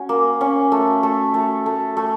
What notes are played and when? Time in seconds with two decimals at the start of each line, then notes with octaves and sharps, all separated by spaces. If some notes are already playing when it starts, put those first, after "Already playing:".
Already playing: C#4 F#4
0.09 A#3
0.41 C#4
0.72 A3
1.03 A3
1.34 A3
1.66 A3
1.97 A3